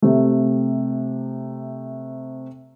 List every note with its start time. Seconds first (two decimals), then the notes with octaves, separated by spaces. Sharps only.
0.02 C3 A3